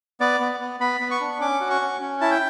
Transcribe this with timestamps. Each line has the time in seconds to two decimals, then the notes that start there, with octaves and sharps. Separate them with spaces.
0.21 B3 D5
0.40 B3
0.60 B3
0.80 B3 B5
1.01 B3
1.11 C#6
1.21 D4
1.40 C#4 D6
1.61 F#4
1.70 C#6
1.81 C#4
2.00 C#4
2.21 E4 A5
2.31 G5